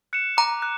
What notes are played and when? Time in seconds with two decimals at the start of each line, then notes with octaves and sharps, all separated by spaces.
0.13 F#6 C#7 E7
0.37 A#5 D6
0.62 F#6